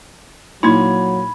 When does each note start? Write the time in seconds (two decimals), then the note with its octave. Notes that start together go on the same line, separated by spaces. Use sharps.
0.63 A#2 F#3 D#4 E4 B5 G#6